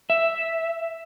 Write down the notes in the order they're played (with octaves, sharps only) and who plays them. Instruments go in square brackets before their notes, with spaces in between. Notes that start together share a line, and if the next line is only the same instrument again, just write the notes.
[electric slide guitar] E5